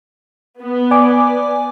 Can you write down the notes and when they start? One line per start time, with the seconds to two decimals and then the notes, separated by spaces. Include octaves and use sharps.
0.61 B3
0.91 D5 G#5 D6